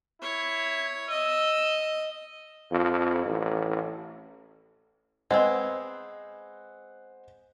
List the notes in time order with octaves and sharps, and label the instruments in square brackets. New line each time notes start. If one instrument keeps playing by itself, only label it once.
[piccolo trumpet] E4 [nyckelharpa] C#5
[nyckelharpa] D#5 [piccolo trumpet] E6
[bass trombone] F2
A1
[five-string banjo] G#3 B3 C4 [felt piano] C5 F#5 [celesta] D#5